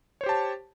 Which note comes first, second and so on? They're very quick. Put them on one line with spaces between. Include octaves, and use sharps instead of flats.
C#5 C5 G4 A5